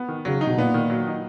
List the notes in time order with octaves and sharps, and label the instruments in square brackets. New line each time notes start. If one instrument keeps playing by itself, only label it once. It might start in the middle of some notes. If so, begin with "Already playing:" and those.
Already playing: [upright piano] B3
D#3
[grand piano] C#3 [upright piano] F#3
[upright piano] D#4
[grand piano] B2
[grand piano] A#2 [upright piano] B3
[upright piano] D#3
F#3
D#4